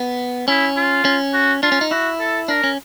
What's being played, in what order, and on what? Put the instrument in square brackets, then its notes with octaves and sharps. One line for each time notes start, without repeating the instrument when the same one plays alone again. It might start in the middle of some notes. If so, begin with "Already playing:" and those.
Already playing: [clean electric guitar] B3
[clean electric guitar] C#4 [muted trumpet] E4
[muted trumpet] F4
[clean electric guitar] C#4
[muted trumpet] F#4
[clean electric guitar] D4 [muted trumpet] F4
[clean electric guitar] C#4
D#4
[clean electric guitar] E4 [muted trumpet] F#4
[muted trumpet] A4
[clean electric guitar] D4 [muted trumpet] A#4
[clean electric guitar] C#4